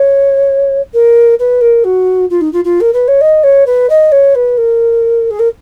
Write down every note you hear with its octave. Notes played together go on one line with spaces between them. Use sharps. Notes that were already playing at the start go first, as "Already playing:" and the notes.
Already playing: C#5
A#4
B4
A#4
F#4
F4
D#4
F4
F4
A#4
B4
C#5
D#5
C#5
B4
D#5
C#5
B4
A#4
G#4
A#4